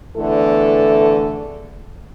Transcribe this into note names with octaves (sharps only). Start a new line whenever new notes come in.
E2 D3 E3 A3 A4